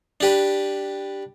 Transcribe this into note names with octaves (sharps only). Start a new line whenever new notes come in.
D4 G4 B4